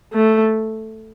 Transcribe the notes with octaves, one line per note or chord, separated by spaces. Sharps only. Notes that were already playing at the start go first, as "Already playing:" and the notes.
A3